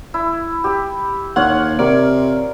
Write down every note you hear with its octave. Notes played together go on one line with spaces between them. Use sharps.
E4
G4 E6
D#2 F4 C#5 F5 F#5
C3 A#4 D5 C#6